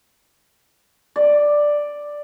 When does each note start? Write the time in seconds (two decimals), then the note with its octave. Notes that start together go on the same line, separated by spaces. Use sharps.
1.16 D5